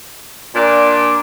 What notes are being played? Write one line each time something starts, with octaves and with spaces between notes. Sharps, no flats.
A#2 D4